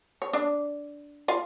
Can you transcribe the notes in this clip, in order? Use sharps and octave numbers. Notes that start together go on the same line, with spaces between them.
C#5
D4 D5
F4 F5